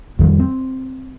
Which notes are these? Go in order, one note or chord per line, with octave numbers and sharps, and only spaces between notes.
F2 D#3 G3
C4